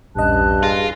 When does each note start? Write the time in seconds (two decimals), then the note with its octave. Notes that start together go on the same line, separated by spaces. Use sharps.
0.16 A#1 E2 G2 C#4 D#5 A5 F#6
0.63 F4 G#4 A#6